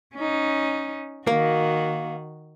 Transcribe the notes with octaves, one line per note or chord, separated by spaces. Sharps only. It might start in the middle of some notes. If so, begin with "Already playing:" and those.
C#4 D#4
D#3 A#3 F#4